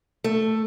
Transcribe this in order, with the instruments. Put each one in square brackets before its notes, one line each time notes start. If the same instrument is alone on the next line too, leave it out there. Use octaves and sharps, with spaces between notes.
[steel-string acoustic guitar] A3